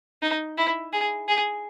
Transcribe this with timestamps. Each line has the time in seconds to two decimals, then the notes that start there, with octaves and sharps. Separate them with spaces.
0.22 D#4
0.58 E4
0.93 G#4
1.28 G#4